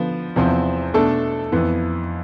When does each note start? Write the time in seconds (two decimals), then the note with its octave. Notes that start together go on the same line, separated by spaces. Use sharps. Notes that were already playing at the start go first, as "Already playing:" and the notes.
Already playing: D3 F3 B3
0.36 E2 C3 F3 C4
0.94 B2 A3 D4 A4
1.52 F2 E3 B3